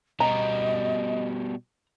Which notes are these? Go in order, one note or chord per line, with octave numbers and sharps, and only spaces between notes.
B2 G3 D#5 A#5